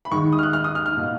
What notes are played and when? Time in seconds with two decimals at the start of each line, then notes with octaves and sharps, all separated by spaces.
0.05 B5
0.11 D#2 D#3 G#3 C#6
0.32 D#6
0.39 F6
0.43 F#6
0.53 F6
0.64 D#6
0.75 F6
0.86 F6
0.97 B2 A#3